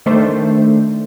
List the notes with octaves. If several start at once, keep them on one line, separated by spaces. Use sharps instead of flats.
D#3 A3 D4 C5